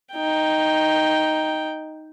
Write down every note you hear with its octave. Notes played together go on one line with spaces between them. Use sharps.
D#4 G5